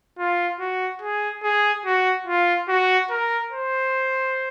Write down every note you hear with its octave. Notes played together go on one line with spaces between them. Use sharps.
F4
F#4
G#4
G#4
F#4
F4
F#4
A#4
C5